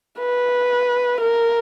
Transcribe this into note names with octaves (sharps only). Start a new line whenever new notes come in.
B4
A#4